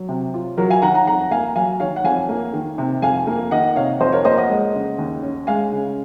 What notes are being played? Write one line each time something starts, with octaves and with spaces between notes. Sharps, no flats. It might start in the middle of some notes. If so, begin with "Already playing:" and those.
Already playing: F#3
C3
F4
F#3 F#4 A#4
F5 G#5
D#3 F#5 A#5
F#5 A#5
F2 F#5 A#5
A#3 F5 G#5
F#3 F5 G#5
D#3 C#5 F5
F#5
F2 F5 G#5
A#3
D#3
C3
F2 F5 G#5
A#3
D#3 D#5 F#5
C3 C#5 F5
F2 C5 D#5
A#4 C#5
A#3 C5 D#5
D#5 F#5
G#3
C#3
D#2
C#4
G#3 F5 G#5
C#3